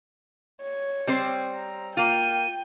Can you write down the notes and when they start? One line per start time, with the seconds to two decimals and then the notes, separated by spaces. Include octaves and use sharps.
0.61 C#5
1.07 G3 C4 C5
1.56 A#5
1.97 A#3 F4 G5 D#7